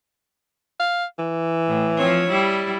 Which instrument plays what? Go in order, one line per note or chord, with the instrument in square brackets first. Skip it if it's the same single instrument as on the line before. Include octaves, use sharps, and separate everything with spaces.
[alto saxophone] F5
E3
[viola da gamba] A2
F3 C4 C#5
G3 E4